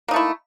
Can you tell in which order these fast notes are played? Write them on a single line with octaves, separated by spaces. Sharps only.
A#3 D#4 A3 E4